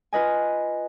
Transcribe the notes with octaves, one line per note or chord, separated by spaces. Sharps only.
F4 B4 D#5 G#5